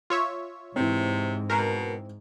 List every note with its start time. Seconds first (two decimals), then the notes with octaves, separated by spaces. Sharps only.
0.10 F4 C#5 E5
0.76 G#2 C3 E3 C4
1.50 B2 A#4